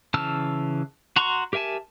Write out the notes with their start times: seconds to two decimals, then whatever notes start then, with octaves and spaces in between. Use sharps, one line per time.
0.14 C#3 E3 A5 E6 F6
1.16 F#4 A#5 C6 C#6
1.53 G4 A#4 E5 G#5 A5